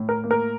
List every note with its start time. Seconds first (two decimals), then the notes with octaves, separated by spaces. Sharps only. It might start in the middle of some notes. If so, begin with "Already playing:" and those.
Already playing: A2
0.09 A#4
0.24 A#3
0.31 A#4